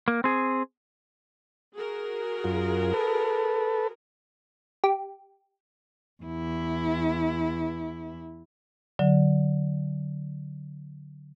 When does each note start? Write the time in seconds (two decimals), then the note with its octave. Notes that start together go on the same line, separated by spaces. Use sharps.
0.08 A#3
0.24 C4 G#4
1.76 F#4 G#4 A#4
2.44 F#2 F4
2.94 A4 B4
4.84 G4
6.23 E2 E4
8.99 D3 F#3